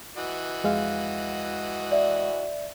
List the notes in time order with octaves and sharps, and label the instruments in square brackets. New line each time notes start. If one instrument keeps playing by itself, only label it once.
[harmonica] E3 F#4 D#5
[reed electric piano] F2 G#3 F5
[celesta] D5 E5